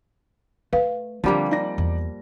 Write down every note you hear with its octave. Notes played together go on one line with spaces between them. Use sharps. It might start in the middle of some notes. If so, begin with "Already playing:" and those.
A3 B4 F5
D3 F3 G3 A#3 C4 D4
D#4 D5 A#6
E2